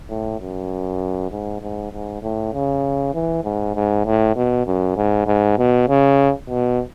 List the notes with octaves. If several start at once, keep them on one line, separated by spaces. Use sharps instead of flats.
A2
F#2
G#2
G#2
G#2
A2
C#3
E3
G#2
G#2
A2
B2
F#2
G#2
G#2
B2
C#3
B2